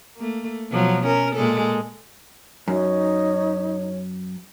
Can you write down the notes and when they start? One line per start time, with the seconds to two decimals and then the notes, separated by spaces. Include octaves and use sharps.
0.16 A3 A#3
0.72 B2 F3 F#3
1.06 C#4 A#4
1.36 A#2 G#3 A4
2.68 F#2 D#4 C#5